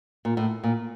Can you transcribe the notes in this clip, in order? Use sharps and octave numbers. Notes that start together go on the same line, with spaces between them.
A#2
A2
A#2